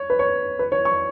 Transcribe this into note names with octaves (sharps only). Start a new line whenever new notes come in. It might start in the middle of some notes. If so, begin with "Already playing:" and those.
Already playing: C#5
B4
C#5
B4
C#5
C#6